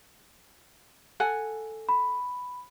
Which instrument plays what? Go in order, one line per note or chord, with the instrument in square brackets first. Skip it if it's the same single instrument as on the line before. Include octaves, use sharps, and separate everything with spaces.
[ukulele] A4 F#5 G#5
[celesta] B5